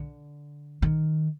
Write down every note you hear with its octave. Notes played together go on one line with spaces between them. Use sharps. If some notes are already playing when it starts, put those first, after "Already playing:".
Already playing: D3
D#3